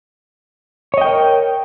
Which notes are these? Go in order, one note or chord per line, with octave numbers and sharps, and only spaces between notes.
A#4 C#5 D#5 G5